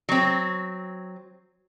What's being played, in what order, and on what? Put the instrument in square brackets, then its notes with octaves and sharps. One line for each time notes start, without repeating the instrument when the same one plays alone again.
[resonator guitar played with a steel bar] F#3 C4